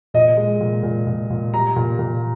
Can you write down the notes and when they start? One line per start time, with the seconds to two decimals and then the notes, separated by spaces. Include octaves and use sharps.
0.14 A#2 D#5
0.37 G#3
0.61 A#2
0.83 A#2
1.07 A#2
1.30 A#2
1.53 G3 A#5
1.76 A#2
1.99 A#2